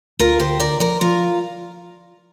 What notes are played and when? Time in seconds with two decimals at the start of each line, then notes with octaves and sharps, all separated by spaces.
0.19 D2 F4 A#4
0.40 D2 G4 C5
0.60 D3 A#4 D5
0.80 F3 A#4 D5
1.01 F3 F4 A#4